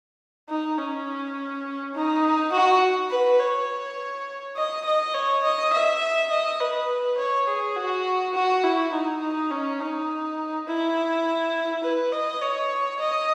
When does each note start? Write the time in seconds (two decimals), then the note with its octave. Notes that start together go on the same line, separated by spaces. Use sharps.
0.49 D#4
0.78 C#4
1.95 D#4
2.53 F#4
3.11 B4
3.40 C#5
4.57 D#5
4.86 D#5
5.14 C#5
5.43 D#5
5.73 E5
6.31 D#5
6.60 B4
7.18 C#5
7.48 G#4
7.76 F#4
8.35 F#4
8.64 E4
8.93 D#4
9.22 D#4
9.51 C#4
9.80 D#4
10.68 E4
11.84 B4
12.13 D#5
12.42 C#5
13.00 D#5